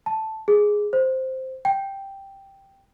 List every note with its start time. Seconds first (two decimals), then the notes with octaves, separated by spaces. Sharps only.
0.06 A5
0.48 G#4
0.93 C5
1.65 G5